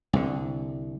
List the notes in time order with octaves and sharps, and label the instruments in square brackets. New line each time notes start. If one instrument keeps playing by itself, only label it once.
[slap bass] C2 D3